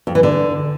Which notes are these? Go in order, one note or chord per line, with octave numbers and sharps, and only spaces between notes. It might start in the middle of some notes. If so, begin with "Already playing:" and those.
F2
E3
D3